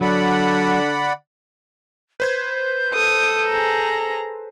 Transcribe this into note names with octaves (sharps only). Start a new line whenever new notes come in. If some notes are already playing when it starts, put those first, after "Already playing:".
D3 F#3 D5 F#5 B5
B4 C5 G6 G#6
A4 D#6
G#4 A#5